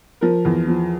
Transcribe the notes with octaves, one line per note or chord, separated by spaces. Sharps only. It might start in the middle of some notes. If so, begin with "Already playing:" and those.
F3 A#4
E2
F3